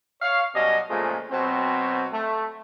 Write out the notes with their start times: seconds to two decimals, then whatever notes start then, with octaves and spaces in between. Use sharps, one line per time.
0.22 C#5 F5
0.55 B2 F#3 G3 C#4 D#5
0.89 A#2 C#3 F3 G#3 A3
1.31 B2 F#3 C4
2.13 A3